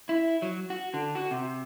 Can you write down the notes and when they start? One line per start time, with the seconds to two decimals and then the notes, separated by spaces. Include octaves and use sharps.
0.09 E4
0.42 F#3
0.70 F#4
0.94 D3
1.15 F#4
1.31 C3